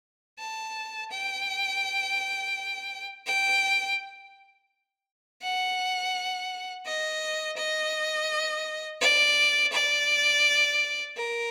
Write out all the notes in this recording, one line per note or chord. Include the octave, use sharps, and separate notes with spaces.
A5
G5
G5
F#5
D#5
D#5
D5
D5
A#4